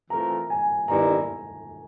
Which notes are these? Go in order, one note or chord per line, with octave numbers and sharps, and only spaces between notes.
E3 A3 C4 F4 A#4 A#5
G#5
G2 D#3 G3 B3 E4 A#5